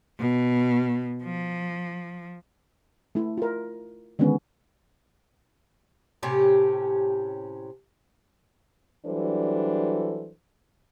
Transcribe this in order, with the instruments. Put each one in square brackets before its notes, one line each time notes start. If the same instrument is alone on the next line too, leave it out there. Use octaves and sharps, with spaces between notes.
[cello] B2
F3
[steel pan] A3 E4
F4 A#4
D3 D#3 G#3 B3 C#4
[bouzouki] A2 C3 C#4 G4
[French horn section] E3 F#3 G3 D4 A4 C5